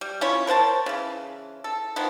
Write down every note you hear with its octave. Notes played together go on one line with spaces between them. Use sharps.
G3
C#4 E4 F4 C#5
A#4 C5 F#5 A5
C#3 E3
A4
D#3 F3 B3